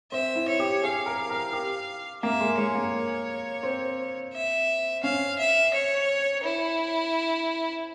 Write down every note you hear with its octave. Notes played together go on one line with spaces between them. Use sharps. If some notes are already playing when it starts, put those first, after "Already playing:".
C4 E5
E4
C#5
G4
G#4 F5
A#4
A#4
G4
A#3 E5
G#3
G#3 C#5
A#3
C4
E5
C#4 F5
E5
C#5
E4